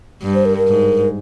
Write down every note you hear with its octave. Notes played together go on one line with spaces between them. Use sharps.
G2
C5
A#4
A#4
G#2